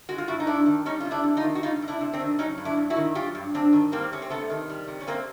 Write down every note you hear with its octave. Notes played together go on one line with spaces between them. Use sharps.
G#3 F#4
F4
G2 E4 F#4
D#4
G2 D4 E4
D#3
G3 C#4 D#4
C3 F4
D4 E4
C3
D#4 F4
D#3
F#4
G3 D#4 F4
C3
D4 E4
C3
C4 D4
D#3
F#3 C#4 D#4
G2
D4 E4
G2
E4 F#4
D#3
F#3 F4 G4
G2
G2 C4 D4
D#3
G3 A#3 C4
C3 C#4
C4
C3 A3 B3
D#3
G3
C3
C#4
C3 A#3 C4